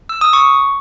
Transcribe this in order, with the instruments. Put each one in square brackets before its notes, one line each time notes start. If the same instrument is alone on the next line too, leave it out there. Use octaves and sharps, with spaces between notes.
[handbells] E6
D#6
C#6